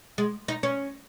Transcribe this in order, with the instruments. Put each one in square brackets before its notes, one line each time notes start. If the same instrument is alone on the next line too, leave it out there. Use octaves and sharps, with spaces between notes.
[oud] G#3
D#4
C#4